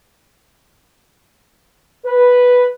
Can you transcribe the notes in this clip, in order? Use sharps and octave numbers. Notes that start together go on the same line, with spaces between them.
B4